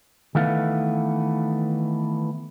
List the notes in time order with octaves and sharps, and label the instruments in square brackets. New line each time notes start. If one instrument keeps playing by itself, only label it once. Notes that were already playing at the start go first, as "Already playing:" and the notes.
[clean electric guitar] D#3 E3 A3 B3 F5